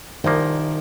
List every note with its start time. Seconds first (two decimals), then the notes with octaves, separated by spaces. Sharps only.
0.24 C2 A#2 D#3 F3 A#3